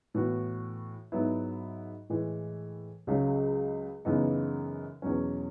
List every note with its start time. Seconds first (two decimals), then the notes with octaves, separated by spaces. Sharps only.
0.14 A2 E3 B3 F#4
1.12 G#2 F#3 B3 E4
2.09 A2 E3 G#3
3.07 C#2 C#3 F#3
4.05 F#2 C#3 E3 B3 D#4
5.02 E2 B2 F#3 C#4